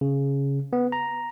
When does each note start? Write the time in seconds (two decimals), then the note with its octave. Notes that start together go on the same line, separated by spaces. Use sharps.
0.01 C#3
0.73 B3
0.92 A#5